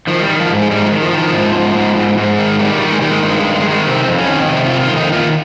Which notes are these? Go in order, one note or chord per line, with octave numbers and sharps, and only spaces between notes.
D#3 F3
G3
D#3
F3
G#2
G#3
G#2 G3
F3
D#3
F3
D#3 F3
G#2
G#2
G#2
G#2
G#2
D#3
D#3 G3
D#3
G#3
D#3 G3
G#3
G2 G#3
D#3 G#3
G#3
D#3 G#3
C3 C4
F2
C#4
D#3
C3 D#4
F4
D#3
F4
F2 D#4
D#3 F4